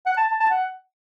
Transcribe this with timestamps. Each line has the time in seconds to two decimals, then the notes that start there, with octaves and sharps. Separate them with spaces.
0.06 F#5
0.17 A5
0.28 A5
0.40 A5
0.51 F#5